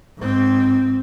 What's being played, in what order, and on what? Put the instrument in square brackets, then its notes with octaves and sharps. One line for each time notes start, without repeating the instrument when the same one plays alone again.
[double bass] G#2 C4